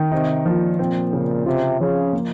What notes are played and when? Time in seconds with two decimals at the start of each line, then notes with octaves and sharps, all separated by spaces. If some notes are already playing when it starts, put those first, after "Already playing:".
Already playing: D#3
0.12 C3 D#4
0.46 A#2 F3
0.79 A#2 C4
1.13 C#3
1.46 C3 F4
1.80 C#3 F3
2.13 A#3